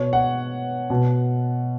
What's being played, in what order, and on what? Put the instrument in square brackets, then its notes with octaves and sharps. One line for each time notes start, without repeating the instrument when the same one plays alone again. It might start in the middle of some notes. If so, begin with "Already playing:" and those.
Already playing: [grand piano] B2 C#5
F#5
B2